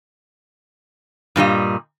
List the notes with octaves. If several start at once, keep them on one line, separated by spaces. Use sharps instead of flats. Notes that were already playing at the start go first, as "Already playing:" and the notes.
G2 A#2 G3 D#5